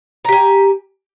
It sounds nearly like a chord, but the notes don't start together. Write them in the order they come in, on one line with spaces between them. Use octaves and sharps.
A#5 G4 G#5